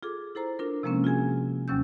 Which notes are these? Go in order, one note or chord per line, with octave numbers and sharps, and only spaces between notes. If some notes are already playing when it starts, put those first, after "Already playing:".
F4 G#4 A4 D6
E4 A4 C5 A#5
D4 F4 A#4
C3 F3 G#3 A#3 C4 C#4
F4 F#4 G#4 G#5
D#2 C3 F#3 C#4 E6 G6